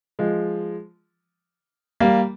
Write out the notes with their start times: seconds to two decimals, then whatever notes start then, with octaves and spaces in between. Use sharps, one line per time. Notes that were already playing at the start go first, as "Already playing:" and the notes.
0.19 F3 G#3
2.00 G3 A#3